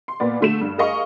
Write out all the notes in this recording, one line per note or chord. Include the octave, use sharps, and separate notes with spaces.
C6
A#2 B3 D5
D3 A3 E7
G2
G#4 A#4 D#5 F5 C#6